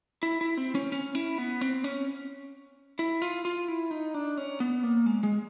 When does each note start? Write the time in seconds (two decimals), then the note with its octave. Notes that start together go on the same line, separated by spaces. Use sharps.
0.23 E4
0.41 E4
0.57 C4
0.75 C#4
0.92 C#4
1.15 E4
1.38 B3
1.61 C4
1.84 C#4
2.99 E4
3.22 F4
3.45 F4
3.68 E4
3.91 D#4
4.14 D4
4.37 C#4
4.60 B3
4.83 A#3
5.06 G#3
5.23 G#3